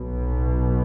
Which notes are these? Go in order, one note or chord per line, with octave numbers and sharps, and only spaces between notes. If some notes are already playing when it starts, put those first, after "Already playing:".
Already playing: B1 B2